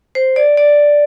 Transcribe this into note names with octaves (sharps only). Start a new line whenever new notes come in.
C5
D5
D5